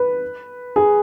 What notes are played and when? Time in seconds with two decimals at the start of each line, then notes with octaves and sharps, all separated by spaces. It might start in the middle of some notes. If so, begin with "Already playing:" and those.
Already playing: B4
0.76 G#4